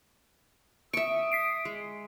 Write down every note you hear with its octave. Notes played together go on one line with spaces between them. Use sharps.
E5 C#6 D#6 D7
B6 C7 D7
G#3